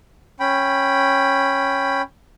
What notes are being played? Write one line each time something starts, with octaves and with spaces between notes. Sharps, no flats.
C#4 G5 B5